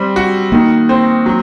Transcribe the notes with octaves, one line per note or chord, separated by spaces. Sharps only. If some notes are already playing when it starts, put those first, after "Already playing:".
Already playing: G3 C4
F#4
D#3 A#3
C4
F#3